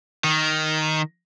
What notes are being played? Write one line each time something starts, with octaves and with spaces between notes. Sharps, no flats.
D#3